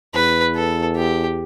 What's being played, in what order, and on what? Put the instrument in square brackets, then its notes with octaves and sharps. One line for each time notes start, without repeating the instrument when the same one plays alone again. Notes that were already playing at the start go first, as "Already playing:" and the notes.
[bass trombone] E2 [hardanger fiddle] B4
[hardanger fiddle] A4
G4